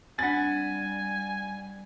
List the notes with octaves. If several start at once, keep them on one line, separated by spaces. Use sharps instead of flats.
G3 C4 D4 F#5 G#5 A6